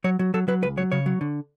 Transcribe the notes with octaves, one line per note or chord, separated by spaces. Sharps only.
F#3 C#5
F#3
F#3 A4
F#3 B4
C#2 B4
F#3 C#5
C#3 C#5
F#3
D3